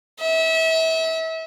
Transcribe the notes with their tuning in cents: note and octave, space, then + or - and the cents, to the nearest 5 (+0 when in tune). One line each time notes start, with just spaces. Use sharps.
E5 -30